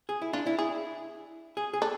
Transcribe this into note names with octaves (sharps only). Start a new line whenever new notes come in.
G#4
E4
D4 F4
E4
E4 G#4
G#4
G#4
D4 A4